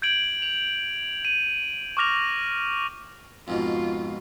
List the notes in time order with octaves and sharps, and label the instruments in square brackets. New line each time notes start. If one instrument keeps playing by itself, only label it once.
[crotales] G6 G#6 D7 F#7
F7
D#7
C#6 D6 F6 A#6 F7
[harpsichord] F2 G#2 B2 [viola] F4